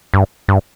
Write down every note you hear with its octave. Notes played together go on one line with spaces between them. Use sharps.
G2
G2